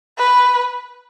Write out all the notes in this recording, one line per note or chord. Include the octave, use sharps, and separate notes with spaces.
B4